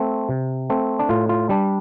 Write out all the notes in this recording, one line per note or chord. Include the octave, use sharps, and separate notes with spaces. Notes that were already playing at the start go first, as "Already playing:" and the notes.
Already playing: A3 C4
C3
A3 C4
D4
A2 F4
F4
G3 D4